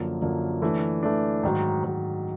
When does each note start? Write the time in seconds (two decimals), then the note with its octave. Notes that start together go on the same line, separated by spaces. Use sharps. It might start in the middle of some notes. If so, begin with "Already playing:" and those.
Already playing: F#2 D3 F3 A#3
0.22 F#2 D3 F3 A#3
0.62 E3 A3 D4
1.03 E3 A3 D4
1.43 G#2 D#3 F#3
1.84 G#2 D#3 F#3